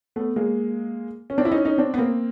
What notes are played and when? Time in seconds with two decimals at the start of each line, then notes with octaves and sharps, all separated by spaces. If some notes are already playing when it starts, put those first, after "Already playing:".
0.16 A3 B3
0.36 G#3 A#3
1.30 C#4
1.38 C4 D4
1.45 E4
1.52 C#4 D#4
1.65 C#4 D#4
1.78 C4 D4
1.94 B3
1.98 A#3 C4